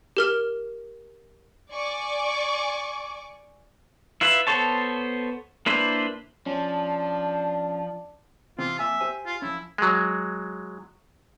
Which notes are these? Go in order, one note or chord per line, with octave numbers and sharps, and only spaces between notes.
G4 A#4 F6
D5 G#5 C#6 D6
E4 F4 B4 E5
B3 A4 C5 C#5 A5
A#3 D4 E4 B4 C5
F3 C#4 D4
C3 E3 C4 F4
F2 A#3 E5 G#5
G4 C5 G#5
F4
F3 C#4 E4
F#3 G#3